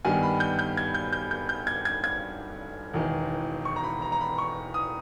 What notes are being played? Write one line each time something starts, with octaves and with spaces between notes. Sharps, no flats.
G2 D#3 G3 B3 G#5
B5
G6
G6
G#6
G6
G6
G6
G6
G#6
G#6
G#6
E1 E2 D#3
C#6
A#5
B5
A#5
A#5
B5
C#6
D#6